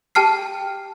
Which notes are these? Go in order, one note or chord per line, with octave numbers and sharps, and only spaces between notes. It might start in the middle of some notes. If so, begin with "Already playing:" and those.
G4 G5 A5 F6 C7